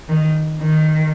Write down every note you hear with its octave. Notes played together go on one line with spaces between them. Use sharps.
D#3
D#3